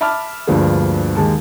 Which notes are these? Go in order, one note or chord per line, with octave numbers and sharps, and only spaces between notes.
E5 A5 B5 D6 F6
D2 G2 F3 A#3 D4 G#4
D#2 G#3 A5